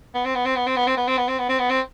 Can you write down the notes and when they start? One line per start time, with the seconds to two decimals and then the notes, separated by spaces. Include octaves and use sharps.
0.15 B3
0.25 C4
0.35 B3
0.45 C4
0.56 B3
0.67 C4
0.76 B3
0.87 C4
0.97 B3
1.07 C4
1.18 B3
1.28 C4
1.39 B3
1.49 C4
1.59 B3
1.70 C4